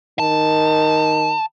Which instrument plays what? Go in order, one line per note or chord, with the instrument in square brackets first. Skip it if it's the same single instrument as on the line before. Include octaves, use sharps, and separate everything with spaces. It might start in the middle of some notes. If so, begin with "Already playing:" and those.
[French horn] D#3 [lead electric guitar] A5